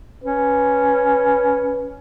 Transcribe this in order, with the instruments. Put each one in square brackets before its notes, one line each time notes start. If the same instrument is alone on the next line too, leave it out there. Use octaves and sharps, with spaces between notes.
[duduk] C#4 [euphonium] B4